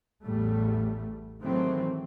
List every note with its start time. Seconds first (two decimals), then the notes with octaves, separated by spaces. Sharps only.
0.25 A1 E2 A2 G3 A3
1.43 D#3 E3 F#3 G#3 A3 C4